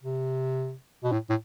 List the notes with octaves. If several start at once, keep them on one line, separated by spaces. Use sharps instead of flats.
C3
B2
A2
A2